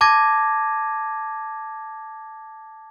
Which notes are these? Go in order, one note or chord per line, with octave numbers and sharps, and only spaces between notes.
A5 D6 G#6 A#6 D#7